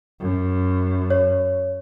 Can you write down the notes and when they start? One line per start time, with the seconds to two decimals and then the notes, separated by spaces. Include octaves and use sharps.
0.20 F#2
1.10 C#5